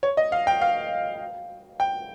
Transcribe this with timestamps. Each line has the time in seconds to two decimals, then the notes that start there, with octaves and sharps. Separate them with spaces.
0.03 C#5
0.17 D#5
0.32 F5
0.47 G5
0.61 F5
1.80 G5